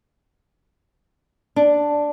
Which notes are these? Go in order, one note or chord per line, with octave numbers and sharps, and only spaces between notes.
D4